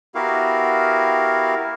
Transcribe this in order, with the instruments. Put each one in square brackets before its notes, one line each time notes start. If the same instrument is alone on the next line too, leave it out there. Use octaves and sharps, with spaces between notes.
[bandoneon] B3 E4 F#4 G4 A#4 F5